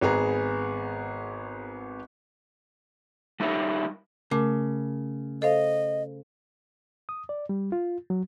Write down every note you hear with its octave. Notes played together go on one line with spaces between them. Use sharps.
G#1 B3 G#4 A#5
G3 D#4 E4 G4 A#4 C#5
C#3 A3 A#4 D6
A4 C5 D#5 F5
D#6
D5
G3
F4
F#3